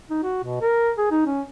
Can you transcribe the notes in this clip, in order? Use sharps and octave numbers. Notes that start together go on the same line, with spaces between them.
D#4
F#4
B2
A#4
G#4
D#4
C#4